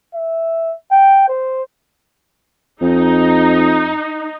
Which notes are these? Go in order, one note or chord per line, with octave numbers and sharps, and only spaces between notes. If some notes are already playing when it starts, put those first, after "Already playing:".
E5
G5
C5
F2 D#4